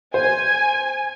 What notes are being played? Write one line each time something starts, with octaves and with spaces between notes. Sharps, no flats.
C5 G#5